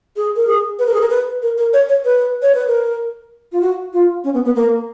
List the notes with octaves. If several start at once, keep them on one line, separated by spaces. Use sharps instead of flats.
G#4
A#4
G#4
B4
A#4
G#4
A#4
B4
A#4
A#4
C#5
C#5
B4
C#5
B4
A#4
F4
F#4
F4
C#4
B3
B3
A#3